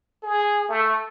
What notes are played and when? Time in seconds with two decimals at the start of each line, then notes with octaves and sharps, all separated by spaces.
0.23 G#4
0.69 A3